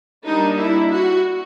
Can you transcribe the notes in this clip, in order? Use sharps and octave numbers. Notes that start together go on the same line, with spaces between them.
G3 A#3 D4 D#4
E4
F#4